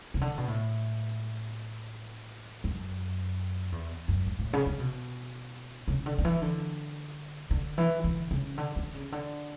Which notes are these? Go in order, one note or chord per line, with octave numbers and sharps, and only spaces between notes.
C#3
D3
B2
A2
F#2
E2
F#2
A2
A2
C#3
C#3
B2
C#3
D3
D3
E3
D3
D3
E3
D3
C#3
D3
D3
C#3
D3